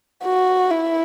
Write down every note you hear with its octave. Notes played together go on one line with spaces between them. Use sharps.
F#4
E4